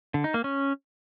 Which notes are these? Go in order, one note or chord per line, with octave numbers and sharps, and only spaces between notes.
D3
D#4
A#3
C#4